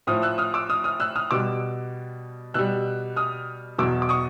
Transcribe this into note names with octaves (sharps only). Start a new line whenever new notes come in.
A2 F3 D#6 F6
E6 F#6
D#6 F6
D6 E6
D#6 F6
D#6 F6
E6 F#6
D#6 F6
B2 G3 D6 E6
B2 G3 E6 F#6
D#6 F6
E2 B2 F#3 D6 E6
D6
C#6 D#6